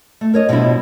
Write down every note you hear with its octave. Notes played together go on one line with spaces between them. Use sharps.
A3
A#4 C#5 D#5
B2 F3 G3 D4 E4